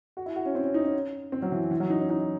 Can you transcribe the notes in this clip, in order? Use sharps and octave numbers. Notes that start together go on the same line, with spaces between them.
F#4
E4
F#4
C#4
C4
C#4
D#4
C#4
C4
F#3
E3
E3
F#3
D#4
C#4
D#4